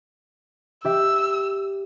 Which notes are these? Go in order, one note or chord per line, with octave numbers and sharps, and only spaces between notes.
G4 E5 E6